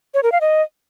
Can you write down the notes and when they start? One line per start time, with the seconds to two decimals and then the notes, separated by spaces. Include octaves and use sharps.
0.14 C#5
0.23 A#4
0.32 F5
0.41 D#5